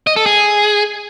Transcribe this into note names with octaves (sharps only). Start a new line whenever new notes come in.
D#5
A4
G#4